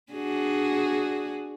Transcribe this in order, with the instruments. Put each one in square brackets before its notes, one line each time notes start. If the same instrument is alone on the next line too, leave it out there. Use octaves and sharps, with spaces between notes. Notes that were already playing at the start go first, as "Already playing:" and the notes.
[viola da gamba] D4 F#4 G#4